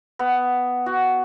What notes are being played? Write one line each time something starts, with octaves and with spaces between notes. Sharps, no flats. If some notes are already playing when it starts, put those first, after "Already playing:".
B3
F#4